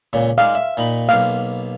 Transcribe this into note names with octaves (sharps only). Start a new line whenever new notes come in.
C#2 A#2 C#3
G#3 D#4 D5 F5
E5
A#2 D#4 B5
B1 B2 A#3 F5